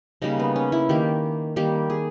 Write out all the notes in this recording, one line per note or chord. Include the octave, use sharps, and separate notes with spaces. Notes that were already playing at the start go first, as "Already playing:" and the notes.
C#3 G3 A#3 D#4
B3
C#4
E4
D#3 A#3 G4
D#3 G3 A#3 G4
G#4